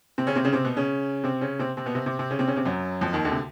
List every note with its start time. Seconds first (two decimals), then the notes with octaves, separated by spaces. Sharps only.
0.18 C3 C4
0.27 C#3 C#4
0.35 C3 C4
0.45 C#3 C#4
0.53 C3 C4
0.64 B2 B3
0.77 C#3 C#4
1.23 C3 C4
1.41 C#3 C#4
1.59 C3 C4
1.77 C3 C4
1.86 B2 B3
1.95 C3 C4
2.06 C3 C4
2.19 C3 C4
2.31 C#3 C#4
2.39 C3 C4
2.47 C#3 C#4
2.56 C3 C4
2.66 F#2 F#3
3.01 F2 F3
3.13 D#2 D#3
3.25 D2 D3
3.32 C3